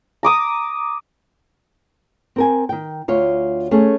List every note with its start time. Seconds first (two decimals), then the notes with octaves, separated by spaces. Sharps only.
0.23 A#5 D6 D#6
2.36 C4 A#4 G#5
2.69 D#3 G5
3.08 D2 F4 C#5
3.71 A3 C#4 G#4